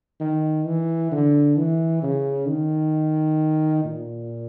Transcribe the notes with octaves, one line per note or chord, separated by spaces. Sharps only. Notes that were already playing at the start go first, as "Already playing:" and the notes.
D#3
E3
D3
E3
C#3
D#3
A#2